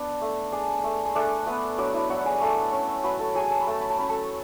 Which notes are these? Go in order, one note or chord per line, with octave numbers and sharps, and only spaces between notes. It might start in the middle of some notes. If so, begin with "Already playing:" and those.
Already playing: B3 D4 B4
A3
D4 G#4
A3
G#4
A3 D4 A4
A3 B3 B4
F#3 D4 D5
E4 E5
F#3 F#4 F#5
G#4 G#5
A3 A4 A5
C#4
F#3 B4 B5
A4 A5
F#3 G#4 G#5
A5
B5
A3 A5
B5
A5
C#4 B5
A4 A5